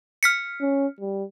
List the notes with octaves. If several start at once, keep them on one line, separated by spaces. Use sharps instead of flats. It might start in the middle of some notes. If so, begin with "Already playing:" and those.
F6 B6 C#7
C#4
G3